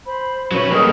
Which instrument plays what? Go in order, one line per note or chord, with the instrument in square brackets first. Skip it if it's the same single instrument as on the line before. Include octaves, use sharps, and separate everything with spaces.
[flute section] C5 B5
[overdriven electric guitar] F#3 B4 [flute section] C#4
[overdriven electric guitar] G3 A#3 [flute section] G#4 A4 D#5